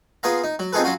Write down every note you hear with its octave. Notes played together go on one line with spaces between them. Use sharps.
B3 F4 G#4 F5 A#5
D#4
F#3
C4 D#4 F4 G#4 A4 B4
F#3 C#4 F4 F#4